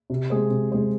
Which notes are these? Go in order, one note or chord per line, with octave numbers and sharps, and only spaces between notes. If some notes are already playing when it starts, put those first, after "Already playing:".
C3
G#3 C4 G#4 C5
C3
G#3 C4 G#4 C5